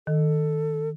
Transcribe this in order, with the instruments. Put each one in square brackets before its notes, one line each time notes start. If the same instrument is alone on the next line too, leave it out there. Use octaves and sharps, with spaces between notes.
[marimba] D#3 [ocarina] A4